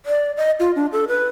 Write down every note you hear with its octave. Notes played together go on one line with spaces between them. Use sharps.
D5
D#5
F4
D4
A4
B4